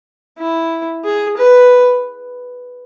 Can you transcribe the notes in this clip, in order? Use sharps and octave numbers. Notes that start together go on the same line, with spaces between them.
E4
G#4
B4